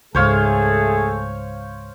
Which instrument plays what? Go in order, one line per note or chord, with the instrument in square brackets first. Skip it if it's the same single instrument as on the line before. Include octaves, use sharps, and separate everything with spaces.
[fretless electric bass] C#2 G#2 [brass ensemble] A3 G#4 A4 [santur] C5 C#5 F5